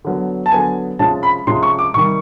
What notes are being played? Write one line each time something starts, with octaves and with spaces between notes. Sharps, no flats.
D3 F#3 B3
A5
D3 F#3 B3 G#5
C3 F3 G#3 C#4 A5
B5
C3 F3 G#3 C#4 C6
C#6
D6
C3 D#3 G3 C#6